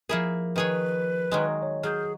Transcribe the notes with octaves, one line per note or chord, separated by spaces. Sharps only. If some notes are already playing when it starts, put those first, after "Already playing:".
F3 A#3 E4 G#4 A#4
D#3 G#4 B4 C#5
D#3 F#3 G#3
C#5
F#3 G#4 F6 G6